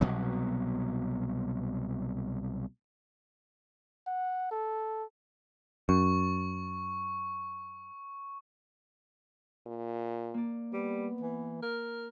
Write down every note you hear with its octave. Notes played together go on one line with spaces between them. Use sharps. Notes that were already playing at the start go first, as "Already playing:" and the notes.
C2 B2 F#3 B3
F#5
A4
F#2 C#6
A#2
A#3 D5
G3 B3
E3
A#4